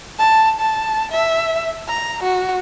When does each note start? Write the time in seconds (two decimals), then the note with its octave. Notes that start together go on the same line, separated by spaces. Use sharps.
0.19 A5
0.60 A5
1.11 E5
1.88 A#5
2.23 F#4